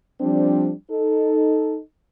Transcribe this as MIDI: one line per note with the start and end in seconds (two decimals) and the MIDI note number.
0.21 0.72 53
0.21 0.72 55
0.21 0.72 60
0.21 0.72 62
0.91 1.78 63
0.91 1.78 69